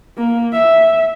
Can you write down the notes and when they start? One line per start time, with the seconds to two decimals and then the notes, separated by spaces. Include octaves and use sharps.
0.17 A#3
0.53 E5